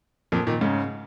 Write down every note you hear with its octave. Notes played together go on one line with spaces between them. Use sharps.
F2 A#2
A#2 D#3
G#2 C#3